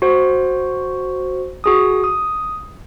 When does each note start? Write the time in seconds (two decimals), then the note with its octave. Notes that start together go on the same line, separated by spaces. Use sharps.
0.02 F#4 C5
1.64 F#4 G#4 D#6
2.04 D#6